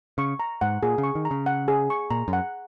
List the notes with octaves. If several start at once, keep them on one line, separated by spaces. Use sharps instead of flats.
C#3 C#6
A#5
G#2 F#5
A#2 G#4
C#3
C#6
D#3
A#5
C#3
F#5
G#4
C#6
A#2 A#5
F#2
F#5